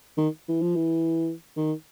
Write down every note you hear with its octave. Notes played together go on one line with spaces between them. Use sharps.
D#3
E3
F3
E3
D#3